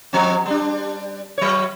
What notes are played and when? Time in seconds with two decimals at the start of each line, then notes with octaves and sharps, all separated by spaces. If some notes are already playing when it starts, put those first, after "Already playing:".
0.13 F3 C4
0.46 G3 D4
1.38 F#3 C#5